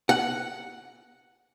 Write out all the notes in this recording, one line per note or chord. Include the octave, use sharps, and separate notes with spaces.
F#5